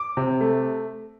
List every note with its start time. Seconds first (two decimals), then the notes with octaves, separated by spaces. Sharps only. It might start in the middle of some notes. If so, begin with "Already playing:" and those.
Already playing: D6
0.17 C3
0.41 A3